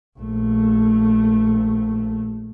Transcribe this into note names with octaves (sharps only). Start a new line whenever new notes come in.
A#1 A3